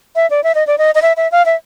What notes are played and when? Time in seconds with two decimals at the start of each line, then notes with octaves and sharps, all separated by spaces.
0.16 E5
0.30 D5
0.44 E5
0.55 D#5
0.67 D5
0.78 D#5
0.95 D#5
1.02 E5
1.17 E5
1.32 F5
1.46 E5